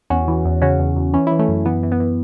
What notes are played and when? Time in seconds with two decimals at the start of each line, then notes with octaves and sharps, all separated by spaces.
0.10 E2 C#4 F#4
0.28 E3
0.45 E2
0.62 C#3 C#4 F#4
0.79 E2
0.96 E2
1.14 E3 C#4
1.27 E3 E4
1.39 A3 C#4
1.48 F#2
1.66 E3 B3
1.83 E3
1.92 B3
2.00 E3